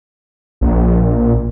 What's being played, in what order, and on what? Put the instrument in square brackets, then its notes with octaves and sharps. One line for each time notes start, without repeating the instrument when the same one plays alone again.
[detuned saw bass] A#1